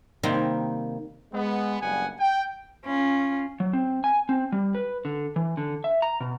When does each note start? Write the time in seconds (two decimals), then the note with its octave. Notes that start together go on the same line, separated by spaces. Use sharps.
0.23 C3 D#3 G3 A#3 F5 C6
1.33 G#3 B3
1.82 F#1 G2 G3 B3 F#5 G#5
2.20 G5
2.86 C#4 F4
3.60 F#3
3.73 C4
4.04 G#5
4.29 C4
4.52 G3
4.75 B4
5.05 D3
5.36 E3
5.57 D3
5.84 E5
6.02 A#5
6.20 B2